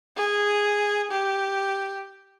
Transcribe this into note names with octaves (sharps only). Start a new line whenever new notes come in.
G#4
G4